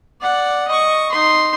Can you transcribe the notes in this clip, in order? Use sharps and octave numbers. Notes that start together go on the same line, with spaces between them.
D5 F#5
D#5 C#6
D#4 C6